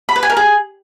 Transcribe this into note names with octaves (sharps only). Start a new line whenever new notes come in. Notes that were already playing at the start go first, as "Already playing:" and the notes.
B5
B4
G#5
A#4
G#4